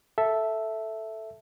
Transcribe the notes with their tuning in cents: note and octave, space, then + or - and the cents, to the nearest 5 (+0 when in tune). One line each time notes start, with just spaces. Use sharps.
A4 +0 E5 +0